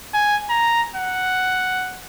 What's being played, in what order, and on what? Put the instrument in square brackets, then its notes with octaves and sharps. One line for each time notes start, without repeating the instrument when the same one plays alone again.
[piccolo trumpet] G#5
A#5
F#5